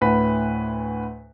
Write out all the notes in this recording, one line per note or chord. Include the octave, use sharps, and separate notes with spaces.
D2 A2 B4 F#5 B6